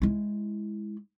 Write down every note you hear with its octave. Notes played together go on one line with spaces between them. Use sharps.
G#3 E4